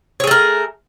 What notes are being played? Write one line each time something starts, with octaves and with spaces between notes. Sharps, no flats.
A3 G#4 A#4 C#5